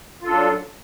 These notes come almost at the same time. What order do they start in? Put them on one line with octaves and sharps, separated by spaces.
F4 A4 D4 F#3